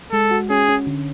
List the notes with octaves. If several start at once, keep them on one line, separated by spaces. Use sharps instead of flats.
G#3 A4
F#4
C#4 G#4
C#4
D3